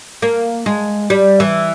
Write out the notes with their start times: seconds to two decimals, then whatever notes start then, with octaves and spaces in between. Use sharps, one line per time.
0.22 A#3
0.66 G#3
1.10 G3
1.40 E3